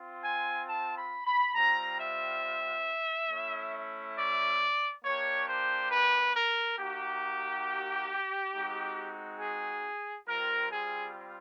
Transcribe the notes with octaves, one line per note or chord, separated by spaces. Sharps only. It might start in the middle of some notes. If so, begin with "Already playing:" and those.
Already playing: C4 F4
G#5
A5
B5
B5
G3 C4 F4 A#5
E5
A3 C#4 E4
D5
A#3 D4 G4 C#5
C5
B4
A#4
A#3 D#4 F#4 G4
G#3 C4 D#4 F#4
G#4
G3 C4 F4 A#4
G#4